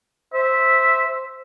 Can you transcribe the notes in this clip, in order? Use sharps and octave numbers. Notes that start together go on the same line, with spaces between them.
C5 E5